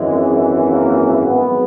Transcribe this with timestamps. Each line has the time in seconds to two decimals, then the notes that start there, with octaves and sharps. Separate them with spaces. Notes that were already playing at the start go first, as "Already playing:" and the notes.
Already playing: G#1 F#2 E3 G#3
0.70 A#3
1.25 G#1 G#2 F#3 B3